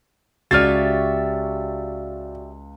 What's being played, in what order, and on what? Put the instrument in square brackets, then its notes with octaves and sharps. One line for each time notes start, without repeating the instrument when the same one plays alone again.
[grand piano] C#2 [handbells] F#4 D5 [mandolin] G4 C#5 E5 [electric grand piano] F6 A6